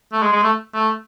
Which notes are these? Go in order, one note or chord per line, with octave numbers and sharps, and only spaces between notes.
A3
G#3
G#3
A3
A3